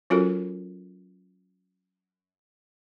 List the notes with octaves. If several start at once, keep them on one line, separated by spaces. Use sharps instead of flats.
F#3 C#4 F4 F#4 A4 A#4